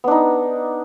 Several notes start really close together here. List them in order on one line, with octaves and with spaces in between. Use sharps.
B3 D4 D#4